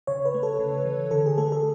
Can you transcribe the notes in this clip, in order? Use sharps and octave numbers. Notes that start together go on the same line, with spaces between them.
C#3 C#5
B4
A3
A4
C#3
E3
D3 A4
G#4
A3 A4
A4